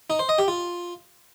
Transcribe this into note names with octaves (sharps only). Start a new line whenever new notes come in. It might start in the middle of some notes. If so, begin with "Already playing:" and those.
D#4
C5
D#5
G4
F4